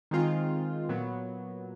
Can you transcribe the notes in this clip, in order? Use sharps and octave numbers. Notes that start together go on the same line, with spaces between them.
D#3 G#3 C4 F4
A#2 F#3 B3